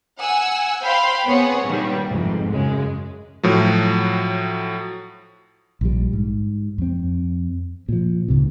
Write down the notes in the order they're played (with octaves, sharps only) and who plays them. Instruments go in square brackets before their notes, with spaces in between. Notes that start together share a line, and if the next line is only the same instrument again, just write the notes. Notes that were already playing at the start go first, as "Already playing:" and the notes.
[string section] F#5 G#5 E6
C5 F5 G5 B5 C6
B3 C4 G#4 C#5 F#5
G2 A#2 D#3 G3
F2 G#2 C3
F#2 C#3 G#3
[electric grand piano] A2 F3 F#3
[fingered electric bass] A#1 A#2 G3
G#2
F2 C4
A#2 F3
C#2 G#2 C3